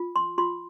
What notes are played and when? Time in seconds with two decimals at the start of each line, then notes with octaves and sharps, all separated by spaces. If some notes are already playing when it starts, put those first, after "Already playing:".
Already playing: F4
0.16 C6
0.38 F4 C6